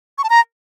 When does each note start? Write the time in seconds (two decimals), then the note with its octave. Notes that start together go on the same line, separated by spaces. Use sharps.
0.18 C#6
0.24 A5
0.30 A#5